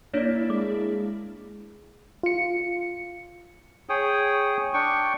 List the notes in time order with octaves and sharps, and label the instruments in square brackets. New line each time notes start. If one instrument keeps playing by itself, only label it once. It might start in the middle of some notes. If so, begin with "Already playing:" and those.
[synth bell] A#3 D4 E4 [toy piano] C#5 D5
[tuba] G#3 [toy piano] D6
[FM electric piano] F4 C#7
[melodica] G#4 C#5 G5 D#6
D4 G5 C#6